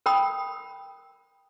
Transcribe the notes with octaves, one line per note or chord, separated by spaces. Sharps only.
A#4 G5 B5 D#6